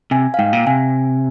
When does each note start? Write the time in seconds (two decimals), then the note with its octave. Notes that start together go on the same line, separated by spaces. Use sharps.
0.11 C3 G#5
0.34 F5
0.39 G#2 G5
0.53 A#2
0.67 C3 G#5